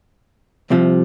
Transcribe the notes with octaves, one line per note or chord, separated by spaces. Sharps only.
C2 C3 F3